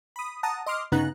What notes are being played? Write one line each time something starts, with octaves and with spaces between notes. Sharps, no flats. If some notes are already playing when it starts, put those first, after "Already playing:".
B5 D#6
F#5 A5 A#5 D#6
D#5 C6 D6 F6
G1 C#3 B3 D#4 A#5 F#6